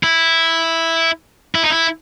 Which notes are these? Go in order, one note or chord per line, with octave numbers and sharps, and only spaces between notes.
E4
E4
D#4
E4